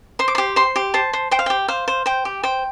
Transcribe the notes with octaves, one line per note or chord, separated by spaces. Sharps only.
C5 C6
D6
G4 C6
C5 C6
G4
C5 A5
C5
C5 G5
F5
G4 G5
C5 F5
C5
C5 G5
G4
C5 G5